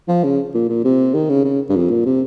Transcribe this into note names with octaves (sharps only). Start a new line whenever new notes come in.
F3
C#3
A#2
A#2
C3
D#3
C#3
C#3
G2
F2
A#2
C3